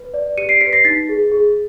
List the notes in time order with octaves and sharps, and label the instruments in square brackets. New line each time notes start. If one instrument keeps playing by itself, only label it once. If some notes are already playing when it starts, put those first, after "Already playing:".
Already playing: [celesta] B4
D5
G4 C#7 D#7
C7 D7
B4 B6 C#7
A#6 C7
D#4 A6 B6
G#4
G#4